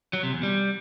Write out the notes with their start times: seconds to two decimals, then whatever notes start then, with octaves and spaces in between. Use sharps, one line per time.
0.13 F#3
0.23 C3
0.33 E2
0.43 G3